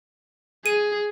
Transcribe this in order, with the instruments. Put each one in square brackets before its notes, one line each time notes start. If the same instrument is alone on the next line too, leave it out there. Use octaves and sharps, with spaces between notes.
[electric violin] G#4 [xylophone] D#7